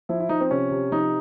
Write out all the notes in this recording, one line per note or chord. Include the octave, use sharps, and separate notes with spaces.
F3 E4
E4
F3 D#4
C4
C3 C#4
C3
F3 D#4